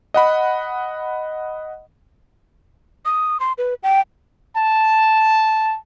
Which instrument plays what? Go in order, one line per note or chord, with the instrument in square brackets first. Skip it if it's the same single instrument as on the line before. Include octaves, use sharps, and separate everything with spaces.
[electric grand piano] D#5 F#5 B5
[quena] D#6
C6
B4
G5
[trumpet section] A5